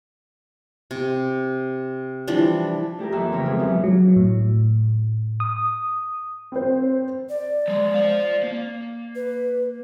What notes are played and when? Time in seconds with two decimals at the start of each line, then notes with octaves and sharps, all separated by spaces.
0.91 C3
2.28 E3 F3 G3 D4
2.99 A3 G4 G#4 A#4
3.12 F2 E3 A#3 E5 E6
3.32 C#3 A3 C4 A#4 C5 C#5
3.46 B2 G#3 G#4
3.59 F#2 C3 E3
3.84 F#3
4.16 A2
5.40 D#6
6.52 C4 C5
7.29 D5
7.68 F3 G#3
7.94 C5 F5
8.43 A#3
9.16 B4